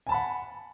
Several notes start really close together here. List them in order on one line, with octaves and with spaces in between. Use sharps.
G#5 A5 B5 F#5